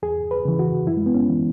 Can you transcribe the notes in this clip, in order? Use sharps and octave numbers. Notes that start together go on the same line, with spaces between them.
E2 G#4
B4
C#3 E3
F#4
F#2 E4
G#3
B3
C#4
E3